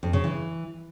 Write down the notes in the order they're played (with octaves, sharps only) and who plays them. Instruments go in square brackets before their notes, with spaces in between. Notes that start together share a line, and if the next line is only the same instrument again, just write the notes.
[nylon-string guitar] F2
C#3
E3